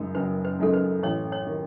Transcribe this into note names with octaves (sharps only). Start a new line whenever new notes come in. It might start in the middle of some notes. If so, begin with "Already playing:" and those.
Already playing: F#1 F#2 C#3 G#3 D#4
F#1 B4
B4
F#2 C#3 G#3 D#4 A4
B4
A1 C#5
C#5
D#3